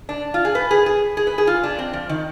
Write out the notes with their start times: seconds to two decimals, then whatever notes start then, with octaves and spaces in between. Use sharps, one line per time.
0.09 D4
0.34 F4
0.45 G#4
0.55 B4
0.71 G#4
0.86 G#4
1.17 G#4
1.27 B4
1.38 G#4
1.47 F4
1.64 D4
1.79 C4
1.93 F3
2.09 D#3